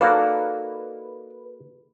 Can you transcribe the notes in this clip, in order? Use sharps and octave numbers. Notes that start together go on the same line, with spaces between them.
A#3 D#4 F#4 A4 B4 D5 F5